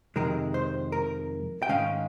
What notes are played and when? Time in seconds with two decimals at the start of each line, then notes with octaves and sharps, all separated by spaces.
0.16 F2 C3 D#3 G#3 A#4
0.54 C5
0.92 A#4
1.62 G5
1.69 G#2 D#3 G#3 C#4 F5